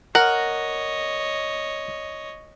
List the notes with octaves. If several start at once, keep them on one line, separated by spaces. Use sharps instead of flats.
A#4 C#5 D#5 F#5